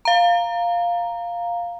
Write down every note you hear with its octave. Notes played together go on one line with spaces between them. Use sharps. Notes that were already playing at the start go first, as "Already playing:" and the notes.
F5 A#5